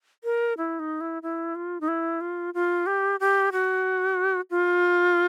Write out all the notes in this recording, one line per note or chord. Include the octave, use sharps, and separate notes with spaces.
A#4
E4
D#4
E4
E4
F4
D#4
E4
F4
F4
G4
G4
F#4
F4